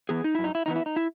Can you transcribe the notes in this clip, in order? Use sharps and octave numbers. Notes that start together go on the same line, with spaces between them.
E3 B3 G#4
D#4
F#2 E4
D#4
E4
E3 B3 D#4
E4
D#4
E4